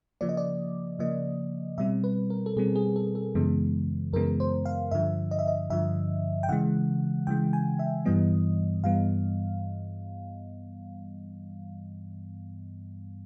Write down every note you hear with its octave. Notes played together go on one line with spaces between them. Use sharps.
C#3 F3 A#3 D5
D#5
D5
C#3 F3 A#3 D#5
B2 G3 C4 E5
B4
A#4
A4
B2 G3 C4 G#4
G#4
A4
A4
F#2 C#3 E3 G#3 B3
F#2 C#3 E3 G#3 B3 A#4
C5
F5
G2 D3 F3 E5
D#5
E5
D#5
G2 D3 F3 E5
G5
C#3 E3 G#3 F#5
C#3 E3 G#3 G5
G#5
E5
G2 E3 G3 B3 D#5
G2 E3 G3 B3 F5